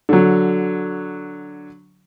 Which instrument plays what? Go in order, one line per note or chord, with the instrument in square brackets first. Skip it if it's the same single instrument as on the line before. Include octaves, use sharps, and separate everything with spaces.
[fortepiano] D3 F#3